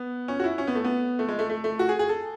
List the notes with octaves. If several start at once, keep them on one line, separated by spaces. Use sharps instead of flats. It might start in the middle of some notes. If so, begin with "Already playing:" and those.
Already playing: B3
C#4
F#4
E4
C#4
B3
A3
B3
A3
G#3
A3
A3
A3
F#4
G#4
G#4
A4